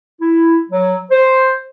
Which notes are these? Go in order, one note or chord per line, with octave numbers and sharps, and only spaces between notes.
E4
F#3
C5